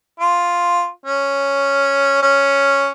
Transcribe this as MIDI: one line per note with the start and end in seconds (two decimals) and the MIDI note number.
0.20 0.89 65
1.06 2.19 61
2.22 2.90 61